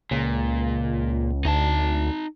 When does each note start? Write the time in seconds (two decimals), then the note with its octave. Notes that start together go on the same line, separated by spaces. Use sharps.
0.11 C#2 A#2
1.45 D2 D#4 A5